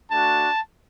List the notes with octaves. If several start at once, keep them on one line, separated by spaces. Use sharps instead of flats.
A3 D4 F#4 A5